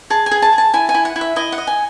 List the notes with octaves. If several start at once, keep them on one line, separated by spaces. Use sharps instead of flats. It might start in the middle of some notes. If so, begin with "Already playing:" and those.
G#4 A5
G#5
G#4
A5
G#4
A5
E4 G#5
G#5
E4
F#5
E4
E5
E4 D#5
F#5
D#5
G#5